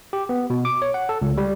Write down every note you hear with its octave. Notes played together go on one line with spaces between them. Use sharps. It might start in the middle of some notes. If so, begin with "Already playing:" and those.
G4
B3
B2
D6
C#5
F#5
A4
C#2
G3